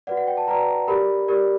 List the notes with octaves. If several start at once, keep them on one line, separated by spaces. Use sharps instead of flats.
F#4 B4 D5 F#5
F#5
G5
A5
F#4 B4 D5 A#5
G4 A#4 D5 B5
G4 A#4 D5